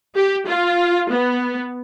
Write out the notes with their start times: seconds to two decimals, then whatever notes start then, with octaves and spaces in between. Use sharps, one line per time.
0.16 G4
0.47 F4
1.11 B3